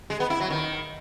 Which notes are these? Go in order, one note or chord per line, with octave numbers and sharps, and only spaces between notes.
G#3
B3
E4
F#3
D#3